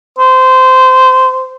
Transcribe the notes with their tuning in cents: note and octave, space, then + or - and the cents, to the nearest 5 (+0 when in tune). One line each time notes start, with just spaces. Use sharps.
C5 -20